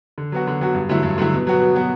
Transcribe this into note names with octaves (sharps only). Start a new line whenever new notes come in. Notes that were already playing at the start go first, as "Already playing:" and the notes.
D3
F#3 B3 F#4
D3
F#3 B3 F#4
G2
D3 F#3 A3 E4
G2
D3 F#3 A3 E4
B2
F#3 B3 F#4
B2
F#3 B3 F#4